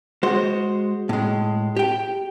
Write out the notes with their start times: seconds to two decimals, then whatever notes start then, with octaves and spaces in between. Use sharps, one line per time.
0.23 G#3 F#4 C5
1.09 A2 G#3
1.76 G4 G5